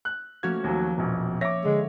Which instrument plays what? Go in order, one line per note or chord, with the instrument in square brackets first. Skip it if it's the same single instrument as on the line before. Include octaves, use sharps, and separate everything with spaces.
[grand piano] F#6
[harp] F3 A#3 C#4 [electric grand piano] A3 F#4 G#6
[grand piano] D#2 F#3
[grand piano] E1 A#1 [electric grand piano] B2
[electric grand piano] C#5 E5 [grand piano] D6 A#6
[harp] D3 [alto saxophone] G#3